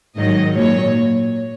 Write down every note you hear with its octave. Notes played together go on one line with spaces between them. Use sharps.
G#2 D#3 F#3 D#5
A#2 F#3 C#5